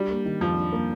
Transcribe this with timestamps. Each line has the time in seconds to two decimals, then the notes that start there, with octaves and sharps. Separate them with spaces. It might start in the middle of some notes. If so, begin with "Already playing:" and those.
Already playing: G3 D4
0.10 A#3
0.25 D#3
0.41 F2 F3
0.57 D4
0.72 A#3